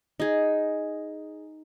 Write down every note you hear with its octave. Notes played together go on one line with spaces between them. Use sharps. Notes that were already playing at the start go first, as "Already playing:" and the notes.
D#4 G#4